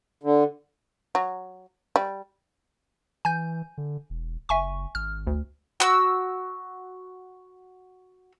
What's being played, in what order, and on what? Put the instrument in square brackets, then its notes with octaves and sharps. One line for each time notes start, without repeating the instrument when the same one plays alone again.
[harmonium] D3
[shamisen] F#3
G3
[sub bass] E3 [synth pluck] G#5 G6
[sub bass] D3
E1
[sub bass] F#1 [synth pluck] E5 G#5 C#6
[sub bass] G#1 [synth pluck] F6
[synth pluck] D2
[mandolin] F#4 E6